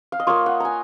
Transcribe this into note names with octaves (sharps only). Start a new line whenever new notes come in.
F5
D#5
A#3 F4 C#5
F#5
G#5 A#5